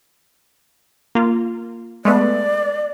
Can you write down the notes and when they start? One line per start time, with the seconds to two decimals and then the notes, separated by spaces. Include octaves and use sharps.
1.15 A#3 F4
2.05 G#3 A3 B3 D5